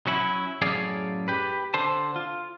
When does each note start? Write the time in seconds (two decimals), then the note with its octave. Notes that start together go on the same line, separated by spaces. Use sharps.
0.07 F#3 C#4 E4
0.62 F#2 A2 G#4 C#5 D5 F5
1.28 G4 B4
1.74 D3 C5 A5
2.16 F4